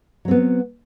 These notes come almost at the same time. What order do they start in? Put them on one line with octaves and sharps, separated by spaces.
F#3 C4 B3